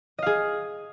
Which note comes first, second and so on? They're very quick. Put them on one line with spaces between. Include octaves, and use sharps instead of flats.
D#5 F5 G#4